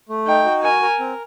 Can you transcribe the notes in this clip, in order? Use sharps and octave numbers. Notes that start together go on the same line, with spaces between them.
A3
D#4 G5
F#4
A#4 G#5
A#4
C4